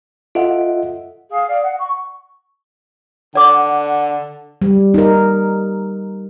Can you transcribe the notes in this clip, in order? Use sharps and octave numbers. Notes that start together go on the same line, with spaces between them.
F4 A4 D#5 E5 F#5
G#4 F5
D5 F5
F#5
C#6
D3 D5 F#5 D6
G3
D#4 A#4